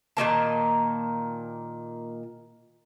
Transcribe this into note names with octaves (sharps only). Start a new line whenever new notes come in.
A#2 D#3 A#3 A5